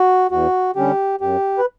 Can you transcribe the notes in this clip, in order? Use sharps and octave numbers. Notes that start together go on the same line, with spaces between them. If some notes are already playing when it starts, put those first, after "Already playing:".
Already playing: F#4
E2 F#4
D3 G3 C#4 G4
F#2 G4
B4